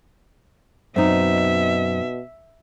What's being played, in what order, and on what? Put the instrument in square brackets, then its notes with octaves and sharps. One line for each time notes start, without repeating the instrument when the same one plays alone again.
[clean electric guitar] F#2 [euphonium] B2 [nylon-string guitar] C4 D#4 [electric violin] E5